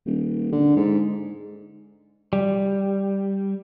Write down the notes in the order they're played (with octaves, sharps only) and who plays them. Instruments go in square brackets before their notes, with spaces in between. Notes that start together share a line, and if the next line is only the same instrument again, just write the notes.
[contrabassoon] D#1
D3
G#2
[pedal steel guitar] G3